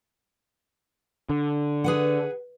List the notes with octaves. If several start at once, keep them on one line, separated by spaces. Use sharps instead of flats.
D3
G#4 B4 F#5